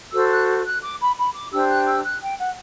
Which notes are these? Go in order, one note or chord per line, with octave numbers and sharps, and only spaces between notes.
F#4 A4 C5 E6
F#6
F#6
D6
B5
B5
D6
D4 G4 C5 E6
F#6
E6
F#6
G5
F#5